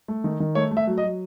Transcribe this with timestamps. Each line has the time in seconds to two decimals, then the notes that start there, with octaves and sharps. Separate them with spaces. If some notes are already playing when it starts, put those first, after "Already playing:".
0.08 A3
0.24 D#3
0.40 D#3
0.55 A3 C#5
0.71 A3
0.77 E5
0.87 F#3
0.98 D#5
1.03 F#3